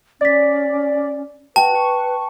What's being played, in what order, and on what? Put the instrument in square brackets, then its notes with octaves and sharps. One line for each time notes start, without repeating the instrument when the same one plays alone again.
[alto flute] C#4 [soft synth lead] D5 [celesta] A6 B6
[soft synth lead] F#4 [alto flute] B4 [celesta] G5 [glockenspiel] A5
[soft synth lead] C#6